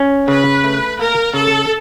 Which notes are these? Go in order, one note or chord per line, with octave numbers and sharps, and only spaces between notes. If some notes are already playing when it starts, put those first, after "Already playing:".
Already playing: C#4
C#3 B4
A3
A#3 A#4
C#3 A4